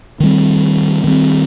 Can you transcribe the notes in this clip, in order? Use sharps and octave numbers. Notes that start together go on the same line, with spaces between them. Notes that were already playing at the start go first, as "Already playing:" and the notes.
D#3 G3 C4
D#3 G3 C4